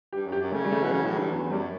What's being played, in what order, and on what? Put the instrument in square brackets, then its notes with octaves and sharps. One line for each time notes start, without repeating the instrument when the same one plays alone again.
[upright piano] G4
[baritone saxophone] G2
F#2
[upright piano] G4
[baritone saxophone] F#2
[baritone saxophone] C#3 [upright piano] A3
[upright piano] G3
A3
[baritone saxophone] B2 [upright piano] E3
[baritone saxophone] C#3 [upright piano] F#3
[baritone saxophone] A2
[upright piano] E3
[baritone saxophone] G2
[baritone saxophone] E2 [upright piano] F#3
[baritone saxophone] F#2 [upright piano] G3